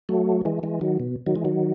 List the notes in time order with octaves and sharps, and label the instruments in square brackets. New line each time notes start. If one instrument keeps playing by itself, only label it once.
[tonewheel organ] F#3 A3
E3 G#3
E3 G#3
D#3 F#3
B2
D#3 F#3
E3 G#3
D#3 F#3